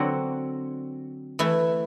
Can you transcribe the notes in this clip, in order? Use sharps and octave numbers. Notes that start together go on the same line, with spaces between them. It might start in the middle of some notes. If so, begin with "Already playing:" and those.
Already playing: D3 F#3 C4 F#4
E3 A3 E4